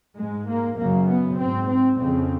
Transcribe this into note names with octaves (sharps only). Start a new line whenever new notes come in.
G#2 G#3
A#3
F#2 C#3 A#3
B3
G#2 C4
C4
F2 C#3 C4